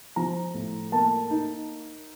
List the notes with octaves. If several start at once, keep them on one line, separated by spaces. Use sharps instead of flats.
F3 A#5
A2
A#3 A5
D#4